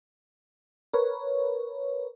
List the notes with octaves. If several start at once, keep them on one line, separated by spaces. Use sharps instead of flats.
A#4 B4 C#5